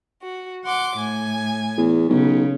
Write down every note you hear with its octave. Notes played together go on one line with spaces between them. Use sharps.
F#4
F#5 C6 D6
A2 G#5
E2
B1 C#3